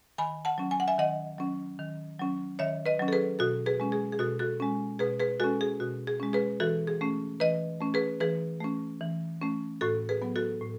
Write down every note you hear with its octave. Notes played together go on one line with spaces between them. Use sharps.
D#3 G#5 B5
F#5 A5
F#3 C#4
G#5
F#5
E5 G#5
D#3 D#5 F#5
F#3 C#4
D#3
F#3 C#4
D#3 C#5 E5
B4 D#5
F#3 C#4
A4
G#4 B4
B2 F#4 A4
G#4 B4
G#3 C#4
G#4
G#4
B2 F#4 A4
F#4 A4
G#3 C#4
B2 G#4 B4
G#4 B4
G#3 C#4 F#4 A4
G#4
B2 F#4
G#4
G#3 C#4
G#4 B4
E3 F#4 A4
G#4
A3 C#4
E3 B4 D#5
A3 C#4
G#4 B4
E3 G#4 B4
A3 C#4
E3
A3 C#4
A2 F#4 A4
G#4 B4
F#3 B3
F#4 A4
A2